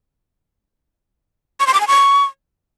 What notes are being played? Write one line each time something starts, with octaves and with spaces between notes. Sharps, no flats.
C#6
C6
D6
G#5
C#6